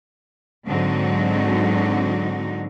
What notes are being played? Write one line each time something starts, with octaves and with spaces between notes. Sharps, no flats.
G#2 D3 F#3 C4 D#4 F#4